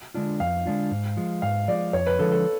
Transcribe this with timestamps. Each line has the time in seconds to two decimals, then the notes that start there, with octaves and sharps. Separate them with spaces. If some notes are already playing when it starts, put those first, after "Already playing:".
0.14 D3 G#3 D4 F4
0.40 F2 F5
0.66 D3 G#3 D4 F4
0.91 G#2
1.17 F3 G#3
1.42 G#2 F5
1.68 F3 G#3 D5
1.93 F2 C#5
2.06 B4
2.19 D3 F3 G#3 A4
2.32 A4